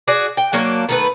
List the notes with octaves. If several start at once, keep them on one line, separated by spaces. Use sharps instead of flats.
F#4 G#4 D5
G5
F#3 A#3 D4
D#3 A3 B4